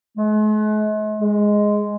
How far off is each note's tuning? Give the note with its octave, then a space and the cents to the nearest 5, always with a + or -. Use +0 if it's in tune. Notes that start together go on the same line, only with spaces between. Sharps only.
G#3 +45
G#3 +0